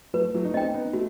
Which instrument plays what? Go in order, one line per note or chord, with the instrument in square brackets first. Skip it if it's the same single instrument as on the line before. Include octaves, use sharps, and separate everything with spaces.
[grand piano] F#3 A3 [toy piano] B4
[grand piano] F#3 A3
D#4
[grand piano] A3 C4 [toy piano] D#5 G5
[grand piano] B3 D#4
[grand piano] A3 [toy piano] F#4